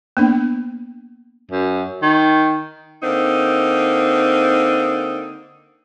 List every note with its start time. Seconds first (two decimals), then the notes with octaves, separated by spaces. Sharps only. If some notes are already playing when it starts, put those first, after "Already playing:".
0.17 A#3 B3 D4
1.51 F#2
2.02 D#3
3.03 D3 A#3 C4 D#4